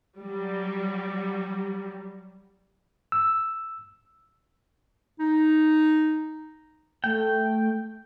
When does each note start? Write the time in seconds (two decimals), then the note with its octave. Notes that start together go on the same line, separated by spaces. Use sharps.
0.18 F#3 G3
3.12 E6
5.20 D#4
7.04 A3 G5